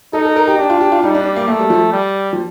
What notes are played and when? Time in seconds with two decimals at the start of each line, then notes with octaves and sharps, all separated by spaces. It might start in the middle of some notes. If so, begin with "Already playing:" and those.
0.13 D#4 A4
0.25 A4
0.36 A#4
0.48 G4
0.58 D4 G4
0.70 F4
0.81 G4
0.92 F4
1.03 G3 D#4
1.15 D4
1.25 D4
1.36 A#3
1.48 A3 A#3
1.59 G3
1.70 F3
1.92 G3
2.33 F3